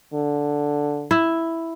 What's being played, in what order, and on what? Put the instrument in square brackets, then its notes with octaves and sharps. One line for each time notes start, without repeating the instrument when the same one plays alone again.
[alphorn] D3
[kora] E4